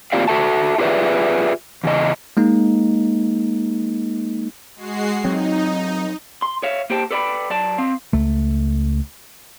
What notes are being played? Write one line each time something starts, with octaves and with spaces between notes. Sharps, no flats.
A#3 C4 F4 G4 D5 F5
F#4 A4 E5 A5
F4 G4 G#4 B4 D5 E5
E2 C#3 D#5
G#3 A#3 D#4
G#3 F#4 C7
F#3 C4 D#4
C6
C#5 E5 F5
A#3 G4 C5 G5 A5
A4 B4 D5 E5 G5 B5
F#3 D5 A5
C4 F5
C#2 A3